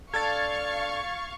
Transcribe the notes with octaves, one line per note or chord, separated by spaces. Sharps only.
D4 A4 F5 C#6 G#6 A6